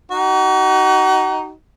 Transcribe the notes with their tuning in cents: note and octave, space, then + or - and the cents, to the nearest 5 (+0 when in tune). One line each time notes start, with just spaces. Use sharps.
D#4 +0 F#4 +35